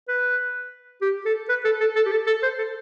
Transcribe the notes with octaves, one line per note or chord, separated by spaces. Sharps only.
B4
G4
A4
B4
A4
A4
A4
G4
A4
A4
C5
A4